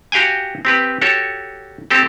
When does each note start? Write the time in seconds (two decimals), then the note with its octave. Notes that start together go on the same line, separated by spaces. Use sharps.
0.12 F#4 G4 F5 G5 G#5
0.65 C4 G4 B4
1.01 F#4 G4 A4 C#5
1.90 C4 G4 A4